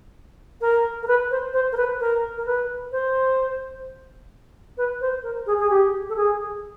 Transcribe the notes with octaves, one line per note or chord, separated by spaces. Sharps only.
A#4
A#4
B4
C5
C5
A#4
B4
A#4
A#4
B4
C5
B4
C5
A#4
G#4
G#4
G4
A4
G#4